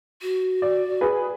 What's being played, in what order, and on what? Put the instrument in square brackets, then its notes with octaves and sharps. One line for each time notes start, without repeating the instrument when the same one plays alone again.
[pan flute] F#4
[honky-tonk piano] D5
G#4 B4